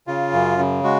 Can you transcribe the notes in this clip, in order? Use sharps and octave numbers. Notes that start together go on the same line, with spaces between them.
C#3 F4
F#2
C#3
G#3 F#4